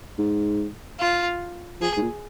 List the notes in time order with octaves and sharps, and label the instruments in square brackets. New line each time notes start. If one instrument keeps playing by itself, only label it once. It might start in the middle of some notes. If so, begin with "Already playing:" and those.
[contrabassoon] G#2
[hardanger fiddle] F4
[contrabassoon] F3 [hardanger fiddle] G#4
[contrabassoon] G#2
A#2